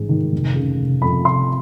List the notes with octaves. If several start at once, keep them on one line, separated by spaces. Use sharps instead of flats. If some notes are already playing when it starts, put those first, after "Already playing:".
Already playing: A1 G#2 G#3
D#3
F1
C#3
F1
F2 B5
F1 C6